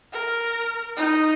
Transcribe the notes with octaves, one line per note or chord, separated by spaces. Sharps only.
A#4
D#4